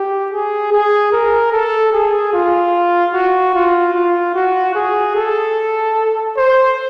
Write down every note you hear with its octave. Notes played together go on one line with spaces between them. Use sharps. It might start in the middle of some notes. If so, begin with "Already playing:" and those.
Already playing: G4
G#4
G#4
A#4
A4
G#4
F4
F#4
F4
F4
F#4
G#4
A4
C5